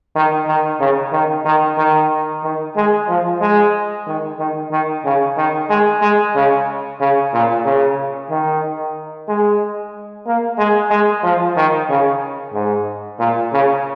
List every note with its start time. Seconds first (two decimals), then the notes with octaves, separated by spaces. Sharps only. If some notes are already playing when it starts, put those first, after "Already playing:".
0.16 D#3
0.48 D#3
0.81 C#3
1.13 D#3
1.45 D#3
1.78 D#3
2.44 D#3
2.76 G#3
3.09 F3
3.41 G#3
4.07 D#3
4.39 D#3
4.72 D#3
5.05 C#3
5.37 D#3
5.70 G#3
6.02 G#3
6.35 C#3
7.01 C#3
7.33 A#2
7.65 C#3
8.31 D#3
9.28 G#3
10.26 A#3
10.58 G#3
10.91 G#3
11.24 F3
11.57 D#3
11.90 C#3
12.54 G#2
13.19 A#2
13.53 C#3